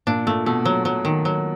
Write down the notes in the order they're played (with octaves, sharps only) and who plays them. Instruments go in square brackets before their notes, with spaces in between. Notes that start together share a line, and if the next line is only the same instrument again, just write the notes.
[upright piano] A#2 [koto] D4
[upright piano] A#2 [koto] A3
[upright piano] B2 [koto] A3
[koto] F#3
F#3
D#3
F#3